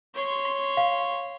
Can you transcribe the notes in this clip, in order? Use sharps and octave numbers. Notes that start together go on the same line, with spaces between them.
C#5 C6
F5